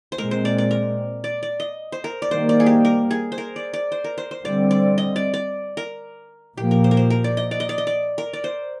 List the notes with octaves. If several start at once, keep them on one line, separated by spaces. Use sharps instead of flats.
C5
A#2 G#3 C4 A#4
C5
D5
D5
A#4
D5
D5
D#5
C5
A#4
D5
D#3 G3 A#3 C5
D5
G#4
G4
A#4
G#4
C5
A#4
D5
D5
C5
A#4
C5
C5
D3 G3 C4 D5
D5
D#5
D5
D5
A#4
A#2 F3 A#3 G4
A#4
C5
A#4
C5
A#4
D5
D#5
D5
D#5
D5
D#5
D5
A#4
D5
C5